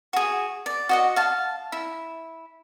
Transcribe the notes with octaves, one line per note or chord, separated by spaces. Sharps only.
F#4 G#4
D5
F#4 D#5 F#5
F5 A5
E4